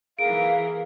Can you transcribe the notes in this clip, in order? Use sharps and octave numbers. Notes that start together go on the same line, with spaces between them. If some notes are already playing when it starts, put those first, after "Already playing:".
E3 A#3 G#4 A#4 F5 D7